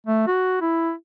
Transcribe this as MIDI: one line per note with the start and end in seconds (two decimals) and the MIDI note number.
0.07 0.26 57
0.27 0.59 66
0.61 0.93 64